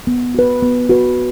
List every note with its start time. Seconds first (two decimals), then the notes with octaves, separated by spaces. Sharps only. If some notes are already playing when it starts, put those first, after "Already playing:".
0.07 B3
0.34 F#4 B4
0.62 B3
0.89 F#4 B4